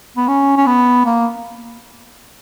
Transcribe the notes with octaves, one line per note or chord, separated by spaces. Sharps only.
B3
C#4
C#4
B3
A#3